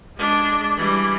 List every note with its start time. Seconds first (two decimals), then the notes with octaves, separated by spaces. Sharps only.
0.17 G#3 D4
0.78 E3 G3